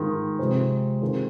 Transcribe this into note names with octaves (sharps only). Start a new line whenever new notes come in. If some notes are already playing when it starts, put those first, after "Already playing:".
Already playing: G#2 D#3 G#3 F4
C3 F3 G#3 C4
D#3 C4 F4 G#4 C5